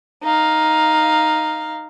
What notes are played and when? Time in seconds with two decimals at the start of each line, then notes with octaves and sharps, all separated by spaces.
0.24 D#4 F5